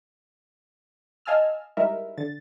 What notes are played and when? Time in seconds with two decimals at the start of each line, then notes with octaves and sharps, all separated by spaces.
1.25 D#5 F5 G#5 A5 E6 F6
1.77 G3 G#3 D#4 E4 A#4 E5
2.18 D3 A6